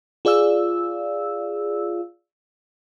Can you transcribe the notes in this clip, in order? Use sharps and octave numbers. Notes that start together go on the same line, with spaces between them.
F4 G#4 D5 F5 E6